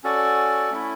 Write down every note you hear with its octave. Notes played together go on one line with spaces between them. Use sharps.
C#4 F#4 A4 D5
A3 C#4 E4